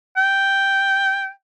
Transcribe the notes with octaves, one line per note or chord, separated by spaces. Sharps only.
G5